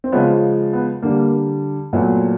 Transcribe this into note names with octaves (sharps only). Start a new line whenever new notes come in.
C4
C#3 F3 G#3 B3 C#4
B3
D3 G3 A#3
A#2 F#3 A3 B3